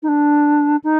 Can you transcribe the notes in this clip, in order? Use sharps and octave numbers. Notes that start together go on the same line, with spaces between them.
D#4
D4
D#4